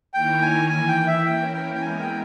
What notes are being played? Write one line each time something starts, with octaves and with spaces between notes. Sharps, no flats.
D#3 A#3 E4 A#4 C#5 G5
G#5
E3 A#3 E4 G#5
G5
E5
E3 A#3 C#4 E4 A#4 G5
G5
G5
G#3 B3 E4 A#4 G#5
G5